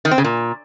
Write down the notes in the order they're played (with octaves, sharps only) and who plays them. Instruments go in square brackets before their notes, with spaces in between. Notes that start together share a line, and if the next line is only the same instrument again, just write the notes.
[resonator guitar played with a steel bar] D#3
C4
C#3
A#2